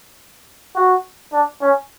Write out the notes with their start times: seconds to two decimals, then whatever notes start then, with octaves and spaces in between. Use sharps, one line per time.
0.76 F#4
1.33 D4
1.62 C#4